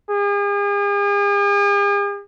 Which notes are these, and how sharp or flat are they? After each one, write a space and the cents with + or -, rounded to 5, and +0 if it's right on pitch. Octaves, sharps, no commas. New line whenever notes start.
G#4 -45